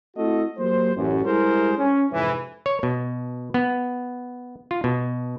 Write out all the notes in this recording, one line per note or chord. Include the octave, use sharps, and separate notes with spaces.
A3 C4 E4 F#4 A4 D#5
F#3 A#3 G4 C5
A1 F#2
G3 G#3 E4 G#4 A#4 C5
C#4
F2 G#2 C3 E3
C#5
B2
B3
F4
B2